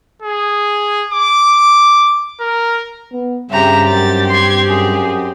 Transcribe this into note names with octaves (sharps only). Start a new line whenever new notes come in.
G#4
D6
A#4
B3
G2 C#3 C4 G4 E5 A#5
F#2 A6
C6 G#6
F#2 G#4